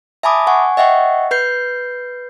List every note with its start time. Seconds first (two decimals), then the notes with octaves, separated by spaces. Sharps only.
0.23 E5 G#5 A5 B5 D6 D#6
0.47 F#5 G#5 C#6
0.77 D#5 E5 F#5 G5 C#6
1.31 B4 G6 C7